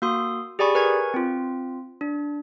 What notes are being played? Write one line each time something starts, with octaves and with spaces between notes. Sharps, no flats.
A#3 F#4 C6 D#6
G4 G#4 D5 G#5 B5 C#6
A#4 B4 G#5 C#6 G#6
C4 F4
D4